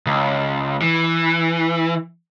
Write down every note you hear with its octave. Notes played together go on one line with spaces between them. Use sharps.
C#2
E3